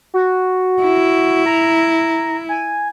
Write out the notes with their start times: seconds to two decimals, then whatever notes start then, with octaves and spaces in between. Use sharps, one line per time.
0.14 F#4
0.83 E4
1.46 A#5
2.49 G#5